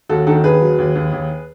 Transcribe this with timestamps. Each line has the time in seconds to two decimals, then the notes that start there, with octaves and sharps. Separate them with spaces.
0.09 D#2 F#4 A4
0.27 D#3 F#4 A4
0.44 D#2 G#4 B4
0.61 F#3
0.78 D#2
0.95 D#2
1.12 D#2